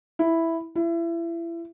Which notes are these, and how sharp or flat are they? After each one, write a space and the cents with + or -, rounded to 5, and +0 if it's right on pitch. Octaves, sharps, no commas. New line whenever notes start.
E4 +0
E4 +30